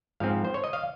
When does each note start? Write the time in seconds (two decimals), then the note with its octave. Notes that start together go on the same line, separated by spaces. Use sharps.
0.20 G#2 F3 C4 F5
0.45 C5
0.54 C#5
0.64 D#5
0.73 F5